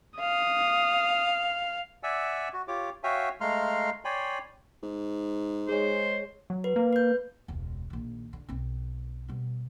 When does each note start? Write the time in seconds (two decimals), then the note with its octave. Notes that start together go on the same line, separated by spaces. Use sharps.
0.20 F5 D#6
2.03 D5 E5 F#5 G#5 E6
2.53 F#4
2.68 F4 G4 C#5 D6
3.03 F#4 C#5 E5 F5 G5 G#5
3.41 G#3 A3 F5 A#5 C6 F6
4.05 C#5 D5 G5 G#5 B5 C6
4.83 G#2
5.69 G#3 G#4 C5 C#5
6.50 F#3
6.64 B4
6.76 A#3
6.93 B4 G6
7.48 E1 C#2
7.90 A#1 D#3
8.33 D3
8.49 B1 C4
9.28 B2 G3